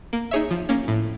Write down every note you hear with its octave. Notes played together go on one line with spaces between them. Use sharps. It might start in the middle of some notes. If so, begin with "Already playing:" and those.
A#3
D#4 G#4 C#5 E5
F3
A#3 C#4
A2